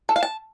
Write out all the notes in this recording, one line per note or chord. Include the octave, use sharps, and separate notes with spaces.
A4
F5
A5